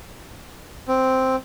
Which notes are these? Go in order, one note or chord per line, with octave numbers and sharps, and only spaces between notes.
C4